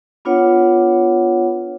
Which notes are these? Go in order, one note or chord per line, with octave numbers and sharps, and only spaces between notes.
B3 D4 F4 B4 C#5 F#5